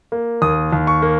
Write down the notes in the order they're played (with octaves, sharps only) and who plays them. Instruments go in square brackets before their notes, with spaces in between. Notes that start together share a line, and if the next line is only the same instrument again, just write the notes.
[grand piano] A#3
D#2 D#6
D#2
C#6
A#3